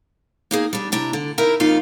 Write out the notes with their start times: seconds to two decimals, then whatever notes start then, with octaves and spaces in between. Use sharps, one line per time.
0.51 A#3 D#4 G#4
0.73 G3 D4
0.92 C3 D4 E4 A#5
1.13 D3
1.38 D#4 E4 A#4 E5
1.60 F2 A#3 D#4 F4